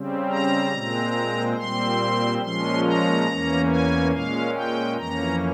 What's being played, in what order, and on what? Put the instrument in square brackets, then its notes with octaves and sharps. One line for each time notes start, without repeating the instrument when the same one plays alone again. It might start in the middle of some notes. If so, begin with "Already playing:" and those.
Already playing: [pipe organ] C#3 G3 C4
A#5
A#2 G#3 C4
A#2 G3 C4 C6
A#2 F3 G#3 C#4 C6
A#5
E2 E3 A#3 C#4
G#5
A#2 G#3 C#4 F5
G5
F2 E3 A#3 C#4 A#5